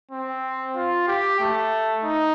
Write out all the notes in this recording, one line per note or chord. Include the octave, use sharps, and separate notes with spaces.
C4
F4
G4
A3
D#4